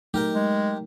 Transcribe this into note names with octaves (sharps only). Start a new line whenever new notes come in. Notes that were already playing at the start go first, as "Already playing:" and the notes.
F#3 A3 D#4 G4 A#4 G5
G#3